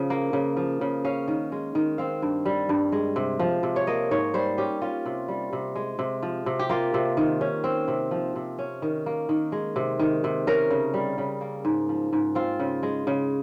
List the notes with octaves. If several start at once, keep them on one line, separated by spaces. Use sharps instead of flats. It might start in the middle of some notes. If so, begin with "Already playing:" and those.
Already playing: C#3 F3
A#3
C#3
F3
C#3
C#4 F5
D#3
G#3
D#3
C4 F5
G2
G3
G2
G#3
C3
F3
C3
C#5
A#3 D#5
G#2 C#5
G3 C5
C#4 G4
C#4 F4
C3
G3
C3
G#3
C3
F3
C3
G4
A#3 F4
C3
D#3
C#4
C4
C3
F3
C3
C#4
D#3
A#3
D#3
G#3
C3
D#3
C3
C#4 A#4
C#3
G3
C#3
A#3
G#2
F3
G#2
C4 F4
C#3
G#3
C#3